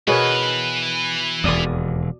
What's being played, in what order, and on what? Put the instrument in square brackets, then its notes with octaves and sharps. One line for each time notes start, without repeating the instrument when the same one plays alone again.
[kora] B2 B3 [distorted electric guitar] E3 B4 [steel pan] G#4 A#4 C#5
[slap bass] E1 D#2 [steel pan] D5 D#6